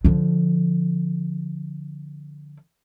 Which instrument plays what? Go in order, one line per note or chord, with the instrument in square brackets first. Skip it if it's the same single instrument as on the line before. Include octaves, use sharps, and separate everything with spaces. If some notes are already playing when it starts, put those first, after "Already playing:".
[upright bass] D3 F3